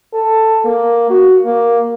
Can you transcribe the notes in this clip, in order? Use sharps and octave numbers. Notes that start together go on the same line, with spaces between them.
A4
A#3
F#4
A#3